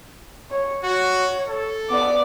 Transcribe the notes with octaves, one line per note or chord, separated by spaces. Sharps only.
C#5
F#4 C#5
A4
B3 D5 D6